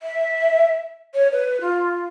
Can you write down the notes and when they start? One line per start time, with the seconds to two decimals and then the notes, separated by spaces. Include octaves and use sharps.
0.01 E5
1.14 C#5
1.32 B4
1.61 F4